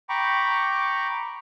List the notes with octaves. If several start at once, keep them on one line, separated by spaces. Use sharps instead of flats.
G5 A#5 B5 C#6 D6